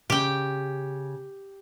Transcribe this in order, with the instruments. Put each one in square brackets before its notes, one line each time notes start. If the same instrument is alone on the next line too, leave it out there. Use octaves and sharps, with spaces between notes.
[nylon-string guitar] C#3 [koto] G4 G5